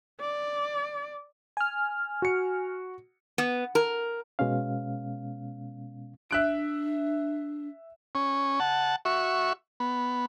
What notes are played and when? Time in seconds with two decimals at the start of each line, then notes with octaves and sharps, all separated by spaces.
0.21 D5
1.57 G#5 F6
2.22 F#4 C#7
3.38 B3
3.75 A#4
4.39 B2 G#3 B3 C#4 F5
6.31 D4 E5 F#6 D7
8.15 C#4
8.60 F#5 A5
9.05 F#4 E5 C#6
9.80 B3